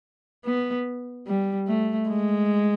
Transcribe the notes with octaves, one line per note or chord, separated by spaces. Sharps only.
B3
G3
A3
G#3